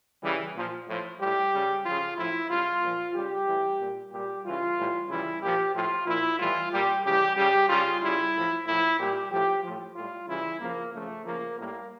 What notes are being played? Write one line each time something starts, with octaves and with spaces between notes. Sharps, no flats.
C#3 E3 G3
A#2 F3
A2 F3
A2 G3 G4
C#3 G3
C#3 F3 F4
A2 F3 E4
C#3 G3 F4
A#2 F3
C#3 G3 G4
A2 E3 G3
A#2 G3
A#2 G3 G4
C#3 E3 G3 F4
A2 E3 G3
C#3 E3 G3 E4
A#2 F3 G4
A2 F3 F4
A#2 F3 E4
A2 E3 G3 F4
A#2 G3 G4
C#3 E3 G3 G4
C#3 G3 G4
C#3 G3 F4
C#3 G3 E4
A2 F3
A2 F3 E4
A#2 G3 G4
A2 F3 G4
A2 F3
A2 G3 F4
C#3 E3 G3 E4
C#3 F3 A#3
C#3 F3 A3
C#3 F3 A#3
A2 G3 A#3